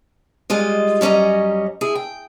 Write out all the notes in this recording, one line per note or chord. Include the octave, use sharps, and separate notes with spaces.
G3 G#3 F4 D#5
F#2 G3 C#4 D#5 A#5
E4 G#4
G5